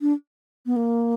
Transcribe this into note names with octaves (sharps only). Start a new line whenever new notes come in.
D4
B3
A#3